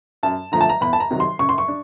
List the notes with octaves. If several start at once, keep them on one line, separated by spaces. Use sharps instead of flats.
F#2 A5
D3 F3 A3 A#5
A5
A#5
E2 B5
A5
A#5
C3 D#3 F#3
C6
C#3 C#6
C6
C#6
D4